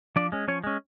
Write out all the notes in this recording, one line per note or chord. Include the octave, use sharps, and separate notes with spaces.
F3 D4 D5
G#3 C#4
F3 C#4 C#5
G#3 C#4